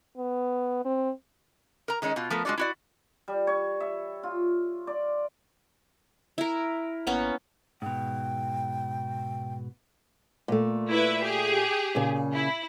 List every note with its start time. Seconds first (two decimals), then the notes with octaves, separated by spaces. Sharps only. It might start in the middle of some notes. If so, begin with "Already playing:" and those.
0.17 B3
0.85 C4
1.88 A#4 A#5
2.02 D#3 G#3 C#4 D#4
2.16 B2 F4
2.30 F3 A3 B3 A#4
2.45 G#3 D4 F4 F#4 D5
2.58 E4 F#4 D5
3.28 G3
3.47 C#5
3.80 E5
4.23 F4
4.87 D5
6.38 E4 A#4
7.07 G#1 A#3 B3 C#4
7.82 G#2 B2 G5
10.48 A#2 A3
10.89 E4 B4 E5
11.23 G4 G#4
11.95 A#2 C#3
12.33 E4